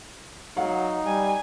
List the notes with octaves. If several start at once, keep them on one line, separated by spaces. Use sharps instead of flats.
F#3 D#4 F5 F#5
G3 G#5